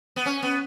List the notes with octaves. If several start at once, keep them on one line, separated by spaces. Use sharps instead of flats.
B3
C#4
B3